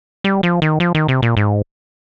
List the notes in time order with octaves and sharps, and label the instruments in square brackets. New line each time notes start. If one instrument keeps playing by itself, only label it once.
[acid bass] G3
F3
D#3
F3
D#3
C3
A#2
G#2